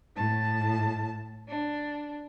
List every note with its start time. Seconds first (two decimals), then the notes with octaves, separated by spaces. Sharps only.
0.15 A2 A5
1.47 D4